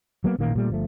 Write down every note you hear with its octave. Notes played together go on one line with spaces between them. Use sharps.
F#3 A#3 B3
A1 A#2 D#3 A#3
A#2 G3 A3
G1 F3 A3